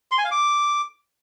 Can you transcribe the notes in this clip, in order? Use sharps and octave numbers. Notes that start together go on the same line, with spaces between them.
C6
G#5
F5
D6